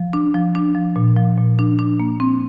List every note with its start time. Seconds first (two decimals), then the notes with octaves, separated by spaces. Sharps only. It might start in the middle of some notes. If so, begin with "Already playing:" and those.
Already playing: F3
0.13 D4
0.35 F3
0.55 D4
0.75 F3
0.96 A#2
1.17 F3
1.37 A#2
1.59 D4
1.79 D4
2.00 A#3
2.20 C4